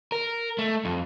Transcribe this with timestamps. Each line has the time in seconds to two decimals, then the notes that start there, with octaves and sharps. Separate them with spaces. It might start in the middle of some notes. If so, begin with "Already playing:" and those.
0.12 A#4
0.58 A3
0.85 F2